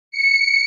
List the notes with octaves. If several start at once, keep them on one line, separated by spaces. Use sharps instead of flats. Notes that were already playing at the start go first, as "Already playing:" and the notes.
C#7